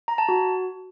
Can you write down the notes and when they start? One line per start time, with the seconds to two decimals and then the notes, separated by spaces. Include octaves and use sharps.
0.08 A#5
0.18 A5
0.29 F#4